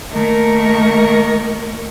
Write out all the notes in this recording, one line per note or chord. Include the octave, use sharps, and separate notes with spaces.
D#3 A3 A#3 A#4 C#6